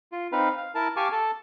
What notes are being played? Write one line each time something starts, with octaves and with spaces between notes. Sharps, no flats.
F4
C4 D#4 B4 F5
F5
E4 A#4 A5
G4 F5 G#5 A5 C#6 D6
A4 A5